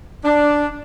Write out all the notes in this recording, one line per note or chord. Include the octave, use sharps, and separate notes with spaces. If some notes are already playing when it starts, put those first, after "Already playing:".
D4